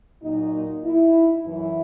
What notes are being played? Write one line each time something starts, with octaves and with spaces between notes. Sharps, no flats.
A#2 F#3 D#4
E4
F#2 E3 E4